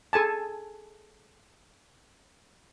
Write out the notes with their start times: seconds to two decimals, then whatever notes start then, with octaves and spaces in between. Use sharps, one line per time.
0.13 G#4 A4 G#5 A5